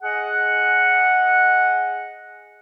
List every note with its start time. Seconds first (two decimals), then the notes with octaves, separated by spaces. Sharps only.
0.02 G#4 D#5 F#5